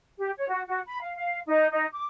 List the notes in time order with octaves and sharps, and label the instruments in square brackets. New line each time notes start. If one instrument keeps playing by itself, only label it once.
[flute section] G4
C#5
F#4
F#4
B5
F5
F5
D#4
D#4
D6